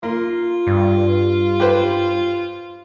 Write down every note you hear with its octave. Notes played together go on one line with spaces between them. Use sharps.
A#3 F4
G2
G4 B4 C5